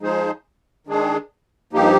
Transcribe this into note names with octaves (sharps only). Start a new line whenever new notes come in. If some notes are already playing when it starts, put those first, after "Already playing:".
F3 G#3 D#4 G#4 C5
D#3 G#3 D4 G#4
G2 F3 A#3 D#4 G4